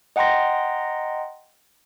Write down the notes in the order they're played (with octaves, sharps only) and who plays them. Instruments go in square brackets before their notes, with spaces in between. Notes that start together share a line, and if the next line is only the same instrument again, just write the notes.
[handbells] D#5 F#5 G5 A#5 C6 A#6